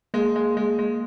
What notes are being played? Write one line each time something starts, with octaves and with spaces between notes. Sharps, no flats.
G#3 A#3
G#3
G#3
G#3